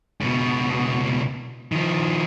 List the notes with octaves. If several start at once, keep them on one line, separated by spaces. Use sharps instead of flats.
C#2 B2
D#3 F3